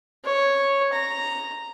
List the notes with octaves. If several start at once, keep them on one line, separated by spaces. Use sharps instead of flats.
C#5
A#5